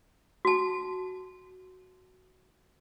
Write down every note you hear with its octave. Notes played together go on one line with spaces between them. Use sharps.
F#4 A5